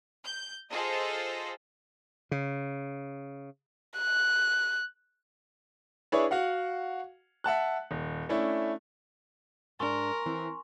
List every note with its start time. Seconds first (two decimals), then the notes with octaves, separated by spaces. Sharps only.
0.25 G6
0.70 F4 G#4 A4 C5 D#5
2.31 C#3
3.98 F#6
6.12 D4 E4 G#4 B4 C#5
6.31 F#4 F5 F#5
7.44 E5 F#5 A5 F#6
7.91 D#1
8.29 A3 C#4 D4 E4
9.80 G#2 D4 A#4 G#5 C6 C#6
10.26 E3 C4